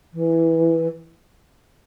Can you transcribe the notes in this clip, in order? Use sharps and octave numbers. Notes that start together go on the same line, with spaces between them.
E3